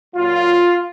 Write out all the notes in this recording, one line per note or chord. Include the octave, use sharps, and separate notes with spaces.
A#2 F#3 F4